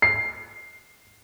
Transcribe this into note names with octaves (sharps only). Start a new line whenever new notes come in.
C7